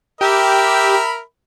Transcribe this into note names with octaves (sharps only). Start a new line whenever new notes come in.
G4 A#4 E5 B5